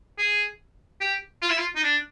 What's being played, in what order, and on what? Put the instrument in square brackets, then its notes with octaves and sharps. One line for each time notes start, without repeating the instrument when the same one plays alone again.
[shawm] G#4
G4
F4
E4
F4
D#4
D4